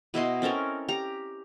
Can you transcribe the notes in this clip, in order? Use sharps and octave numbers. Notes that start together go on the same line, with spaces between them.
B2 E4 D#5 C6
C4 C#4 A4 A#4
G4 A#5